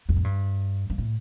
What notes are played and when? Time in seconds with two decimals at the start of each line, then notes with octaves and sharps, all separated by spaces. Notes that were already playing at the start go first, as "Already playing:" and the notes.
0.09 F2
0.16 A2
0.24 G2
0.90 G2
0.98 A2